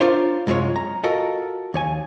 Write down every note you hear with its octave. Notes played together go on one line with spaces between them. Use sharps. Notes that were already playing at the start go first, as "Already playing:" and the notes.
D4 F4 A#4 C5 C#5
C2 F#2 G#3 F4 C#5
A#5
F4 F#4 A4 A#4 D#5
D#2 C#5 G#5